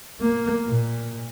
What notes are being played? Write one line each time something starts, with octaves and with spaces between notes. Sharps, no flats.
A#3
A#2